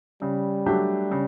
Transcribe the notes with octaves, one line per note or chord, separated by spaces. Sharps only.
C#3 G3
F#3 A3 D4 G4
C#3